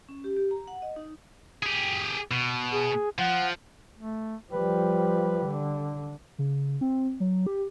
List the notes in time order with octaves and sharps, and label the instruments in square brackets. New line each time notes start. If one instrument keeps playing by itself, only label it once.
[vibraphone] C#4
G4
G4
A#5
F#5
D#5
D#4
[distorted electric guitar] G4 G#4
B2
[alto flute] G#4
[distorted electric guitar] F3 [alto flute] F#5
[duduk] A3
[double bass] F3 G3 [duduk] B4
[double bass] D3
[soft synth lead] C#3
C4
F#3
G4